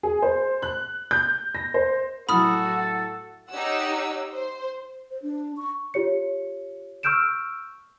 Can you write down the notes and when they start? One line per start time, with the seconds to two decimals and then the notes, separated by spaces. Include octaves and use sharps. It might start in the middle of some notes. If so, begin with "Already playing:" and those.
0.03 G#4
0.22 C5
0.62 F#6
1.11 G6
1.55 A#6
1.74 C5
2.29 A2 F#3 F#4 A4 B5 D#6 F6
3.50 D#4 G4 C#5 F#5 E6
4.33 C5
5.11 C5
5.22 D4
5.57 C#6
5.94 F4 G4 C#5 C#7
7.03 C#6 E6 F6 G6 D7 E7